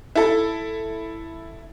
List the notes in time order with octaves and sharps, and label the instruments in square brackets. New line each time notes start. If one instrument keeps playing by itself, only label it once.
[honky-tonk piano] E4 A4